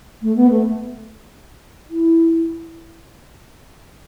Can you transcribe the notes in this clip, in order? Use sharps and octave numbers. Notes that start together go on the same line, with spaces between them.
A3
B3
A3
E4